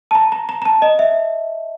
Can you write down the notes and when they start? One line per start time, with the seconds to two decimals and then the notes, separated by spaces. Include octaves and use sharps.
0.11 A5
0.15 A#5
0.32 A#5
0.49 A#5
0.62 A#5
0.65 A5
0.82 D#5
0.99 E5